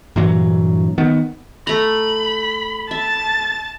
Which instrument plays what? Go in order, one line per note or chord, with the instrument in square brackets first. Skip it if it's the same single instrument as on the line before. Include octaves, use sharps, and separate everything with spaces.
[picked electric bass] G2 A#2 E3 F#3
D#3 B3
[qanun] A3 A#5 [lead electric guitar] B5
[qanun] E5 [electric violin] A5 A6